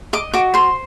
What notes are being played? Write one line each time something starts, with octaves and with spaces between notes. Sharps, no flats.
D#5 D6
F#4 D6
C5 C6